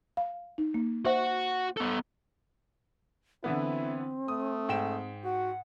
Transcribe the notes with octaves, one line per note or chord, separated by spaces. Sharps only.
F5
D#4
A#3
F#4 C5 E5 F#5
B3 A4
D3 E3 B3 C4 E4
A3 D#6
G#2 G5 E7
F#4 F#5